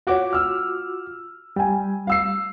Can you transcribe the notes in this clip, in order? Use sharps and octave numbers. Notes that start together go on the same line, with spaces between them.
F4 F#4 C#5 F#5 D6
E6 F6
G3 G5 G#5
F5 E6 C7